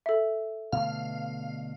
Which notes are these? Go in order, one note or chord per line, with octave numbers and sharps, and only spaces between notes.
A4 E5
B2 D3 A3 F5